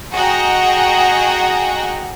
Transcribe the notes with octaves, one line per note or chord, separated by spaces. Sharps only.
F#4 G#4 D#5 F#5 G5 A#5